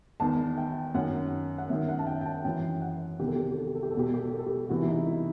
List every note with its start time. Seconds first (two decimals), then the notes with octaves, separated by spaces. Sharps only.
0.20 E2 D#3 A5
0.58 G5
0.94 F#2 D#3 F#5
1.58 F#5
1.69 F#2 D#3 E5
1.89 F#5
1.99 A5
2.07 G5
2.21 G5
2.25 A5
2.44 F#2 E3 G5
2.82 F#5
3.19 E2 C3 D#3 G4
3.28 A4
3.36 G4
3.43 A4
3.52 G4
3.59 A4
3.67 G4
3.75 A4
3.83 G4
3.91 A4
3.94 E2 B2 G4
4.07 A4
4.14 G4
4.23 A4
4.30 G4
4.39 A4
4.47 G4
4.69 E2 C3 E3 F#4
4.82 E4
4.88 D#4
5.06 E4